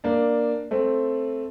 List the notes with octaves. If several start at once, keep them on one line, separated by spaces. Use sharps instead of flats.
A#3 D4
A3 C4